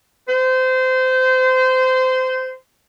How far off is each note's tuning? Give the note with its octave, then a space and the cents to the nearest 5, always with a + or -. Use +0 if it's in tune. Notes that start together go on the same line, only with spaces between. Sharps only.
C5 -25